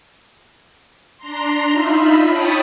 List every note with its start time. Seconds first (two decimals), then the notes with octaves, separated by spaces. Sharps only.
1.18 D4 A#5 C6
1.71 D#4 F4 E5 B5
2.26 C#5 G5 A5 B5 D#6